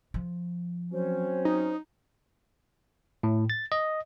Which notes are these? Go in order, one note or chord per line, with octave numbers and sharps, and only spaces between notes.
F3
F#3 C4 C#4 C5
D#4
A2
A6
D#5